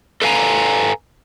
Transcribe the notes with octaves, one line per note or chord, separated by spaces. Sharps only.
A4 B4 F5 G#5 A#5